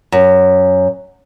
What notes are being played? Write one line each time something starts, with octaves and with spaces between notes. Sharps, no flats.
F#2